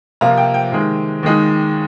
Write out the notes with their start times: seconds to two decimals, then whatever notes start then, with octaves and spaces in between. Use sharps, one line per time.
0.21 C3 F3 A#3 F4 A#5
0.37 G5
0.54 G5
0.72 C3 D#3 G#3
1.23 D#2 D#3 G#3 D#4